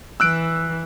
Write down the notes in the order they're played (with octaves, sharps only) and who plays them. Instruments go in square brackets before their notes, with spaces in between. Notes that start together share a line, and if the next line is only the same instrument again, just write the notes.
[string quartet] E3 [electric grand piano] E6 F#6 D7